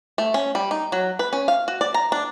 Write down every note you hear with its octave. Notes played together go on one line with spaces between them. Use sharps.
A3
C#4
G3
D#4
F#3
B4
C#4
F5
F#4
D5
A#5
D4